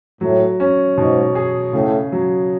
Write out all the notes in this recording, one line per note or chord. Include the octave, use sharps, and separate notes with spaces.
A2 F#3
C#4
G#2 B2
G#4
A2 C#3
F#3